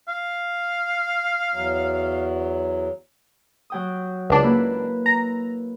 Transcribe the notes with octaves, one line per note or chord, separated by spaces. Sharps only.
F5
E2 F#3
F#3 G5 D#6
C#2 D4
A#3 E4 B4
A#5